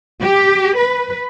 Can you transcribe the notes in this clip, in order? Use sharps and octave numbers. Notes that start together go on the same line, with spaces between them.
G4
B4